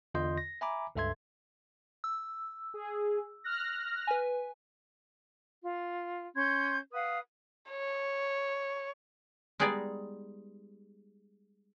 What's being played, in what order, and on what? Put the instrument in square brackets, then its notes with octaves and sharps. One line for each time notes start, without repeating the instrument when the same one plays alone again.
[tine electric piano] E2 D3 F4 D#5 C6 G6
A#6
E5 G#5 A#5 B5 D6
C#2 G2 A4 E5 C6 G#6
[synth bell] E6
[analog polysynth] G#4
F6 F#6 A#6
[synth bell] B4 G#5
[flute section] F4
C#4 C6 G6 G#6
B4 F5 F#5 D#6
[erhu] C#5
[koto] G3 G#3 B3 D#4 G#4 D5